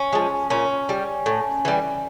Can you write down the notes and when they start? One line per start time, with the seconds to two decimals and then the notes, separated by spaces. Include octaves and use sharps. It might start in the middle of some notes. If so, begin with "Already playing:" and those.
Already playing: C#4
0.13 F3 G#3
0.50 A#2 C#4
0.89 G3
1.26 A2
1.65 E3 G3